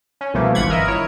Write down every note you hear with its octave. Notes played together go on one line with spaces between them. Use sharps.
C#4
C2 B2 F3 A3 A#3
G#1 E3 F4 F#5 B5 G#6
G1 A#4 D#5 E5
E4 A#4 C#5